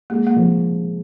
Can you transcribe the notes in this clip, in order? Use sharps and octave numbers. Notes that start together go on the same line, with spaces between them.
G#3 A#3
A#3
F3